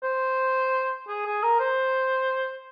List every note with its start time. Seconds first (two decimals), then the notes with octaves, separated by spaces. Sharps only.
0.03 C5
1.08 G#4
1.25 G#4
1.43 A#4
1.60 C5